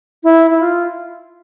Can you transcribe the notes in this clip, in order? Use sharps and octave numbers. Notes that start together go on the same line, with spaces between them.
E4
E4
F4